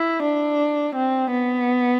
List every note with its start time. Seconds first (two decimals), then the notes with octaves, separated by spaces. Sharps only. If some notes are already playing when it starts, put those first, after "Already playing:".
Already playing: E4
0.23 D4
0.95 C4
1.31 B3